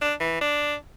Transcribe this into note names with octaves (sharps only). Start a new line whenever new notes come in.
D4
E3
D4